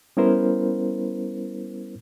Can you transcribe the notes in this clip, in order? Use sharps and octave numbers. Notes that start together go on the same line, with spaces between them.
G3 B3 C#4 E4 A#4 C5